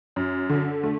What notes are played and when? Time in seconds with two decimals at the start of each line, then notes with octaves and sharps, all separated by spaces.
0.16 F#2
0.49 D3
0.83 A3